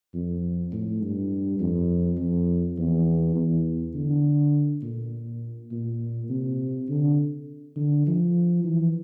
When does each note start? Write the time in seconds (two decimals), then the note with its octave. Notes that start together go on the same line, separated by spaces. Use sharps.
0.14 F2
0.72 A2
1.02 G2
1.60 F2
2.18 F2
2.78 E2
3.36 E2
3.95 D3
4.83 A#2
5.71 A#2
6.30 C3
6.89 D3
7.76 D3
8.07 F3
8.64 E3